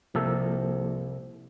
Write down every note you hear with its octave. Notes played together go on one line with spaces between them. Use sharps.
C2 C3 F3 A#3 A4